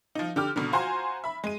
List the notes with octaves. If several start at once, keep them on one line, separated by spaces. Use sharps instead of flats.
F3 D#4
D3 G4 F6
G#1 B2 D3
F4 F#4 C5 G#5 A#5 C6
E5 B5
G#3 D#7